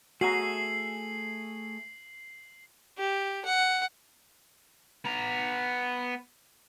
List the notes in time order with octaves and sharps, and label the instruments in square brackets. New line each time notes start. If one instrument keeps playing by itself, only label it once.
[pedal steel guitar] A3 G#4 E5 [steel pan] F#4 A#5 [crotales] C7 F#7
[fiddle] G4
F#5
[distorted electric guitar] B3 A#5